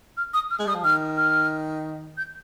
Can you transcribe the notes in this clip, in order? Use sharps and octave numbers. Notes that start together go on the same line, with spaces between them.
F6
D#6
F6
G#3
G3 D#6
F3
D#3 F6
F6
G6